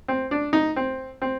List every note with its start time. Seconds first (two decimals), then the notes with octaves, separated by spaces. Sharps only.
0.08 C4
0.31 D4
0.53 D#4
0.76 C4
1.22 C4